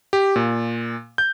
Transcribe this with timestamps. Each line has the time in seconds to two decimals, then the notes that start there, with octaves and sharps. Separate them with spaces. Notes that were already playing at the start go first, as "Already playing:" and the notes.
0.13 G4
0.36 A#2
1.18 G6